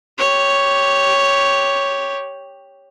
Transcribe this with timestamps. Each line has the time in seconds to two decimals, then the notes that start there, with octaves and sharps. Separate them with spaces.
0.18 G4 C#5